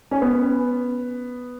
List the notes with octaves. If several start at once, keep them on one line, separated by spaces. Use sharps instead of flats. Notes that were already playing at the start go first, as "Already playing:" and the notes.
C#4
B3